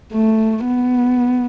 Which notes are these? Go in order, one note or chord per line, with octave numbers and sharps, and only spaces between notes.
A3
B3